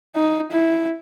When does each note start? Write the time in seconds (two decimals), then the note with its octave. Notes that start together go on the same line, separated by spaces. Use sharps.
0.16 D#4
0.52 E4